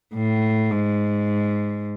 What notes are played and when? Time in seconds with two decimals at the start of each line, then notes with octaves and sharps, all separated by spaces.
0.15 A2
0.70 G#2